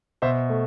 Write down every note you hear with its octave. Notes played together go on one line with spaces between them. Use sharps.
B2 C5 E5
A3